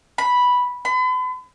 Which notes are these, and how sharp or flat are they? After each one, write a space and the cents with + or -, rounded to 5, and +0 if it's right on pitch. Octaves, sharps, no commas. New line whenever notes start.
B5 -5
B5 +40